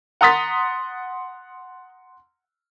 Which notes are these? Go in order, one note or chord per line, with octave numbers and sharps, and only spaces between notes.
F#5 A#5 C6 D#6 A6 B6